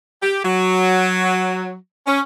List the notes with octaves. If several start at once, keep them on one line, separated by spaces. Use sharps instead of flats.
G4
F#3
C#4